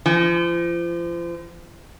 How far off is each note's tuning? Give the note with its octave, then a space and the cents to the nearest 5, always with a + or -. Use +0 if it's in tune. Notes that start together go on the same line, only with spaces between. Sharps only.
F3 -35